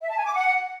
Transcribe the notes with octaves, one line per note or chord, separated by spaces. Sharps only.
E5
A5
G#5
D6
F#5